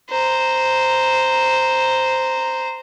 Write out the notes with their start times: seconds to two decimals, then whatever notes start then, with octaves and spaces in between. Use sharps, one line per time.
0.10 C5 A#5